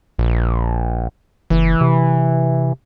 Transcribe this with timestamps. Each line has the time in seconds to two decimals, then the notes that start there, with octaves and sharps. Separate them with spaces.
0.19 A#1
1.50 F#1 E3
1.81 C3